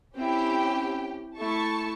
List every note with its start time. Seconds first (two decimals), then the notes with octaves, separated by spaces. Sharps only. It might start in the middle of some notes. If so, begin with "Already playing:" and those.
0.15 C4 C#4 E4 G4 G5
1.38 A3 E4 A5 C#6